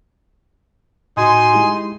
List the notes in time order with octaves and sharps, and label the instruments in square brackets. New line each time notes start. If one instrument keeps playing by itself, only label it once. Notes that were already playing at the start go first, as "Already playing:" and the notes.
[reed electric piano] A2 F#4 [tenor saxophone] D#4 [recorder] G#5 [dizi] C6
[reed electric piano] G#3 E4 G4